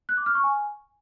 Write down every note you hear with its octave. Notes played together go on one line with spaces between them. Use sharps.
F#6
D6
F6
C#6
G#5